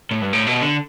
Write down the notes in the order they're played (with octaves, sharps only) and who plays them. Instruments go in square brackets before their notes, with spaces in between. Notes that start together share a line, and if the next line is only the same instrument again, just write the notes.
[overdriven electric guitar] A2
G2
A2
B2
D3